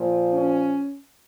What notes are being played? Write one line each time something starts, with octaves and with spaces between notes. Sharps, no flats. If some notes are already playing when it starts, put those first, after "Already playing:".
Already playing: A#2 F3
C#4